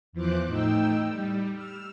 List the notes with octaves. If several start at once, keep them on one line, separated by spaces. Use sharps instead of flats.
E2 E3 F3 C5 D6 F#6
A2 D#4 G5 E6
G3
E6 F6